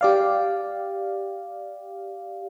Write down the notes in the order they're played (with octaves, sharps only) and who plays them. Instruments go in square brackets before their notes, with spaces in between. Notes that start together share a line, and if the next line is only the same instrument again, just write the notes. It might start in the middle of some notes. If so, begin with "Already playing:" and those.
[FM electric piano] G4 D5 F5